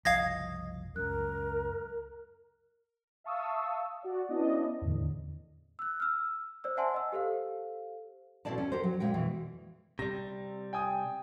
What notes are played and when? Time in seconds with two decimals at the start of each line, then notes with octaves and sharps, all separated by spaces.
0.05 F#1 C2 F3 D#5 F5 D#6 G#6 A#6
0.96 C#2 F#2 A#4 F#6
3.24 E5 F5 A5 C#6 D#6 E6
4.03 F#4 D5
4.29 B3 C#4 D4 E4 D5 D#5
4.81 E2 A2 D3
5.79 E6 F#6
6.00 E6 F6
6.64 C5 D5 E6
6.77 C5 E5 F#5 G#5 A5 C6
6.94 D#5 E6
7.12 G4 A4 C5 F5
8.45 B2 A3 C4 E4 D5 A5
8.58 C#4
8.72 G4 A#4 C5
8.84 F#3
9.00 A#2 G#3 G5
9.14 B2 E3
9.99 C3 G3 A#6
10.73 G5 G#5 D#6